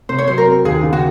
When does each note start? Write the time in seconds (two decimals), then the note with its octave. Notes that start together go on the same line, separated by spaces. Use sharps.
0.09 C3 C5
0.18 C#5
0.28 F#3 C5
0.38 A#4
0.46 C4
0.65 D#2 G#4
0.83 C#3
0.93 F#4